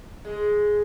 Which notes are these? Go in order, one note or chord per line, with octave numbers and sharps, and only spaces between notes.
G#3